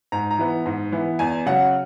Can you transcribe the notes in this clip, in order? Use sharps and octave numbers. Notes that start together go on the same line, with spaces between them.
G#2 A#5
A#5
E3 B3
G#2
E3 B3
E2 G#5
C#3 F#3 F#5